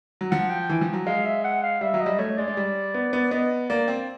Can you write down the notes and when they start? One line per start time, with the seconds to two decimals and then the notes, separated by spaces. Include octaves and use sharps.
0.21 F#3
0.31 F3 F#5
0.50 G5
0.69 E3
0.81 F3
0.93 F#3
1.06 G#3 F5
1.25 E5
1.44 F#5
1.63 F5
1.81 G3 E5
1.94 F#3
2.01 D#5
2.06 G3
2.19 A3 C#5
2.38 G#3 D5
2.48 G#3
2.57 G3
2.94 B3
3.13 B3
3.31 B3 D#5
3.69 A#3 D5
3.88 C4